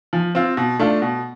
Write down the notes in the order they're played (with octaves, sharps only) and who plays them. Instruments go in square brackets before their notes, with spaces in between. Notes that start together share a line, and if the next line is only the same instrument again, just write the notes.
[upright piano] F3
C4 F4
B2
A3 D4 F4
B2